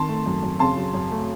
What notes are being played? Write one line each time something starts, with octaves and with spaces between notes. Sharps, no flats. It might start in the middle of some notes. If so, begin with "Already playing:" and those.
Already playing: D#3 A5 C6
A3
F#2
F#2
C#3 A5 C6
F#3
F#2
A3